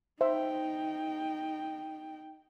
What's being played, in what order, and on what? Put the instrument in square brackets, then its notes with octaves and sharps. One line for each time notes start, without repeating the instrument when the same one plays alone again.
[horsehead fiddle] D#4 G5 [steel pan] C5 E5